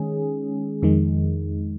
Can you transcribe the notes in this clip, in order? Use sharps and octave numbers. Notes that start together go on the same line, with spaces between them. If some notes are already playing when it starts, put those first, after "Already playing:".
Already playing: D#3 G#3 C#4 G#4
F2 D#3 G#3